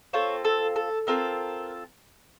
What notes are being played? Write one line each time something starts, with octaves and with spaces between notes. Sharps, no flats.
C4 F4 A4 C#5
A4
A4
C4 F4 A4 A#4